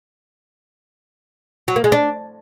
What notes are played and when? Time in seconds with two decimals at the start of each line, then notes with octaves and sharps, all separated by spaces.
1.68 F#3
1.76 A#3
1.84 G#3
1.92 D4